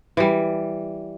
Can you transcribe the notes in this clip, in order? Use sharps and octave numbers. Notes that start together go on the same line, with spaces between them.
E3 G3